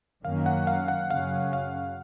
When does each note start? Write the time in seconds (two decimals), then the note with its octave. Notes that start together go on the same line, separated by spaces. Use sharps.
0.25 F#2 D#3 F#3 A#3 C#4 F5
0.46 F#5
0.67 F5
0.88 F#5
1.10 F#2 C#3 F#3 C#4 F5
1.53 F5